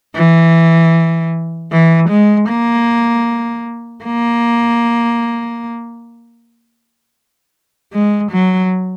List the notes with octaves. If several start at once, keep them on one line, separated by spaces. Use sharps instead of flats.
E3
E3
G#3
A#3
A#3
G#3
F#3